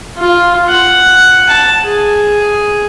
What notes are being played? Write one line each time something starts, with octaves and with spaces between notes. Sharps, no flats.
F4
F#5
A5
G#4